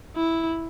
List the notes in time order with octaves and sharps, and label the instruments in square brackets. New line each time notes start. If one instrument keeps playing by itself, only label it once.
[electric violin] E4